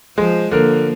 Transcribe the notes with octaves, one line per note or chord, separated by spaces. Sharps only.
F3 G#3 C5
D3 F3 A#3 A#4